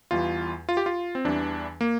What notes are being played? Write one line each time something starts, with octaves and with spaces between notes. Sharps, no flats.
E2 E3 G3 F4
F4
G4
F4
C4
E2 E3 G3 D4
A#3